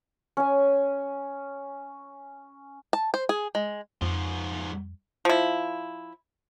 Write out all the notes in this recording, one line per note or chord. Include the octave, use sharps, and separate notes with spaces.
C#4 G#5
A5
C5
G#4
G#3
F2 G#2 F3
F3 E4